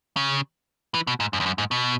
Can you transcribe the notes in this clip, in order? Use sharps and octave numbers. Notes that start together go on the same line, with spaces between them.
C#3
E3
B2
G#2
F#2
E2
F#2
G#2
B2